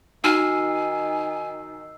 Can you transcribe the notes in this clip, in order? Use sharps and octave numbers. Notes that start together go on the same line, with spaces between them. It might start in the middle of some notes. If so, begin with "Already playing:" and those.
D#3 D#4 F#4 G#5 E6 F6 C7